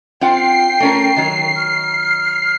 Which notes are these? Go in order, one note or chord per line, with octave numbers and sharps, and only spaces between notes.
C4 F4 F#5 G5 C7
A3 C#4 A#4
D#3 F#3
F6